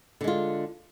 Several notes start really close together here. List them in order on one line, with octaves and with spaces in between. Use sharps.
D3 G#3 F4